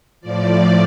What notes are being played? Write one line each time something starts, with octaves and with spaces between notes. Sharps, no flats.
A2 F3 D5